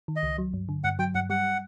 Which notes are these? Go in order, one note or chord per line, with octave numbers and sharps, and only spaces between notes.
D#3
D#5
C#2
F#3
G2
D3
G2 F#5
F#3 G5
G2 F#5
G3 F#5